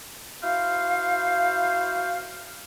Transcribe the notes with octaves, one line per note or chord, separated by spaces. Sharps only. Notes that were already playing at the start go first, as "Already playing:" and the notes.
E4 F#4 C5 F5